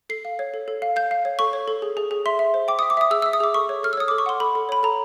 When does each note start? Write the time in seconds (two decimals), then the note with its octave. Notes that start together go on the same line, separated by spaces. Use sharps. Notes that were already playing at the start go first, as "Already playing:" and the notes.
0.09 A4 C7
0.25 F5
0.39 C#5
0.54 A4
0.68 A4
0.82 F5
0.96 F5 G6
1.11 F5
1.25 C#5
1.39 A4 C#6
1.53 C#5
1.68 A4
1.82 G#4
1.97 G#4
2.11 G#4
2.26 E5 C6
2.39 E5
2.54 C5
2.68 G5 D6
2.79 E5 D#6
2.90 D6
2.97 E5 D#6
3.11 G#4 E6
3.22 E5 E6
3.33 D#6
3.40 G#4 D6
3.54 A4 C#6
3.69 C#5
3.83 A4 F6
3.93 E6
3.97 C#5 D#6
4.08 A4 D6
4.18 C#6
4.26 F#5 C6
4.40 A4 B5
4.55 A4
4.69 C#5 B5
4.83 A4 A#5